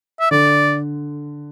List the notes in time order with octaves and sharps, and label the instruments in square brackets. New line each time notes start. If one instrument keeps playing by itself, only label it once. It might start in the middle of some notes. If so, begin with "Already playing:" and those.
[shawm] E5
[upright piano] D3 [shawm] D5